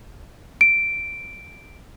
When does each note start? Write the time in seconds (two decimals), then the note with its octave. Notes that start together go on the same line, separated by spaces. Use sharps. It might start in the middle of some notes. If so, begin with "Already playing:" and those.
0.61 D7